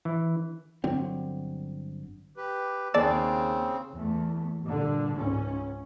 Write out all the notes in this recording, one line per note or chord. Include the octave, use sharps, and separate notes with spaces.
E3
G1 D3 F#3 C4
G4 B4
D#2 C#3 C4 G#4 D5 A5 E6
E2 A3
G2 A#2 D3
C#2 G#2 C#4